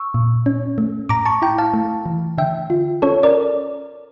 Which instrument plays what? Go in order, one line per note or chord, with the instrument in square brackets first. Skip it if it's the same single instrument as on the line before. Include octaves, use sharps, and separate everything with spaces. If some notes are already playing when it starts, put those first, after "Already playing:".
Already playing: [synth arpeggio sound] C#6 E6
A#2
C#4
A3
A2 A#5 D6
A5 C#6
E4 G5 A#5
F5 A5
A3
E3
D3 E5 G5
F4
C#4 A4 C#5
A#4 D5